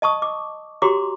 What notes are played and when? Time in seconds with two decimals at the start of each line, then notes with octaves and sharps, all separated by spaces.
0.02 D#5 A5 C#6 D#6
0.22 D6
0.82 F#4 G4 C#5 A#5 C6 D6